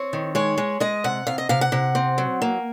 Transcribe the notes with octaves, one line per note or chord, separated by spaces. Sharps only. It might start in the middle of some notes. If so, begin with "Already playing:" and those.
Already playing: C4 C#5
D#3
G#3 C#5
G#3
G#3 D#5
C3 F#5
C3 F5
D#5
C3 F5
F#5
C3
C4
F#3
A#3